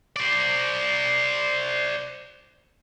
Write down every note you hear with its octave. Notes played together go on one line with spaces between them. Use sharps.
C5 D5